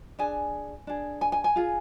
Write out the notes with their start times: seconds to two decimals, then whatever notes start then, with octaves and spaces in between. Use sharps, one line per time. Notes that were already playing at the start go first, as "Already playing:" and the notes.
0.19 D4 G#4 G#5
0.87 D4 G#4
1.21 G#5
1.32 G#5
1.44 G#5
1.56 F4 G#4